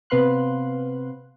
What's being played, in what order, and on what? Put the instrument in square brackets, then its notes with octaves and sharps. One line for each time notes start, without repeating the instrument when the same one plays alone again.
[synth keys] C3 B3 B4 F5 C6 F#6